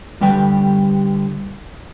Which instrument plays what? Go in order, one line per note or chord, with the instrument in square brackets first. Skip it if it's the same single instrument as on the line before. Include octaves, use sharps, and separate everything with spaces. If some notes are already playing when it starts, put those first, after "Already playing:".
[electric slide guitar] D3 G3 G4 B4 G5